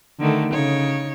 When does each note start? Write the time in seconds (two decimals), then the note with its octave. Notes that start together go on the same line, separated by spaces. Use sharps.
0.20 D3 D#3 A3
0.53 C#3 D#4 C#5